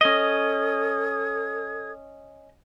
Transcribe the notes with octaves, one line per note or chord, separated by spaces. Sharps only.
C#4 A4 D#5 D#6 G#6